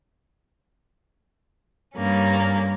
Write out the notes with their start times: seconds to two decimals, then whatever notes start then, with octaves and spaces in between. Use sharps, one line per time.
1.95 G2 A#3 C#4